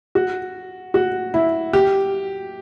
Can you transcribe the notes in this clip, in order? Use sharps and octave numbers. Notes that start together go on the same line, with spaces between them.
F#4
F#4
E4
G4